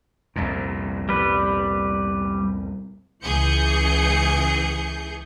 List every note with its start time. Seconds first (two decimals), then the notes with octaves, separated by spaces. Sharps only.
0.36 C2 F2 A#2
1.09 G3 B4
3.23 C#2 E3 G#4 G6 C#7